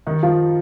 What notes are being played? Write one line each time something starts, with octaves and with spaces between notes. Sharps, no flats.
D#3 D#4
F3 F4